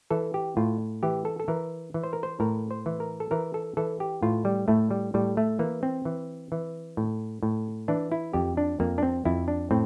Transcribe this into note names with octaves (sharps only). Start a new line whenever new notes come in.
E3 A4
G4
A2 F4
E3 G4
A4
A4
E3 A#4
E3
C5
A#4
C5
A2 A#4
C5
E3
A#4
A4
E3 A#4
A4
E3 A4
G4
A2 F4
G3
A2 A3
G3
A2 G3
A3
E3 A#3
C4
E3
E3
A2
A2
E3 D4
E4
F2 G4
D4
F2 A#3
D4
C4
F2 E4
D4
A2 C4